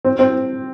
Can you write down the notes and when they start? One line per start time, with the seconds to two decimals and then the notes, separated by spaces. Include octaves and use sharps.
0.05 C4
0.19 C4